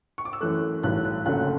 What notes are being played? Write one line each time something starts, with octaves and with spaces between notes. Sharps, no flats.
C#6
D6
E6
F#2 E3 A3 F#6
B1 A2 E3 G3 F#6
F#6
F#1 F#2 D3 F#3 A3 F#6